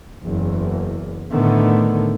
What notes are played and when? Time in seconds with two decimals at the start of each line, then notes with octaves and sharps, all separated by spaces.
0.23 F#1 E2
1.32 A2 D3 D#3 A3 B3